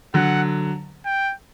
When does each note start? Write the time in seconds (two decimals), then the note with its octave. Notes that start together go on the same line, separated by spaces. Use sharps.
0.14 D3 F#3 F#5
1.06 G5